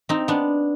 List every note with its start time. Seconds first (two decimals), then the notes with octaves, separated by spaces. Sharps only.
0.09 C4 D#4
0.28 B3 D4